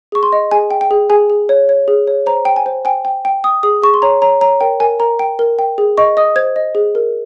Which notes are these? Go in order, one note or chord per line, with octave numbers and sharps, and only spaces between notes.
G#4 C#6
C6
D#5
G#4 G#5
G5
G5
G#4
G#4 G#5
G#4
C#5
C#5
G#4
C#5
C5 A#5
G5
G#5
C5
G5 G#5
G5
G5
G5 D#6
G#4 D#6
G#4 C#6
C6
C#5 A#5
C#5 A#5
C#5 A#5
A#4 G5
A#4 G#5
A#4 A#5
G5
A#4
G5
G#4
D#5 C#6
D#5 D#6
C5 G#6
D#5
G#4
A#4